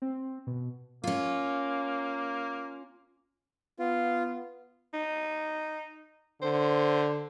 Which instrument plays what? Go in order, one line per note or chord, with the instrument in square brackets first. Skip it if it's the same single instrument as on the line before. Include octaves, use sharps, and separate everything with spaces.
[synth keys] C4
B2
[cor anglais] A#3 [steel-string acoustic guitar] C#4 F4
[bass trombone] B3 [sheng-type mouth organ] F4
[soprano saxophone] D#4
[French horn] D3 [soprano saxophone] C5